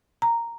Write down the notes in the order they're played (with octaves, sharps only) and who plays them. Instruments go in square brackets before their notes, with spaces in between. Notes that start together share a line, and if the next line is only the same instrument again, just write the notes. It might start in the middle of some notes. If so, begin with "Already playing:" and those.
[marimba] A#5